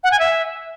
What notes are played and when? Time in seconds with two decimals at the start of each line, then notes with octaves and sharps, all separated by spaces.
0.04 F#5
0.12 G#5
0.19 E5